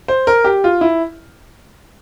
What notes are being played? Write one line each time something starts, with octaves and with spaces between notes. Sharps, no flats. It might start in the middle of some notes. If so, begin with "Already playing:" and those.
C5
A#4
G4
F4
E4